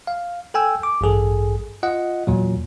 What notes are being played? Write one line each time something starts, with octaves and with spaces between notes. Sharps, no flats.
F5
A4 G5 G#5 E6
D6
A1 G2 G#4 A4
F4 D#5 F#5
E2 A#2 F#3